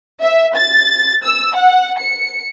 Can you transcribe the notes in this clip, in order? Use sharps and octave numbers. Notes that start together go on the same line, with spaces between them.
E5
A6
E6
F#5
C#7